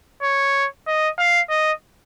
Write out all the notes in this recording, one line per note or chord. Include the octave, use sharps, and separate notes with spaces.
C#5
D#5
F5
D#5